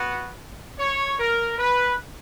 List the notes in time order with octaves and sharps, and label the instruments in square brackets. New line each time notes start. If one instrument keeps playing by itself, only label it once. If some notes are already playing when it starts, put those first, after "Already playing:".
Already playing: [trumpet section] B3 F#4
C#5
A#4
B4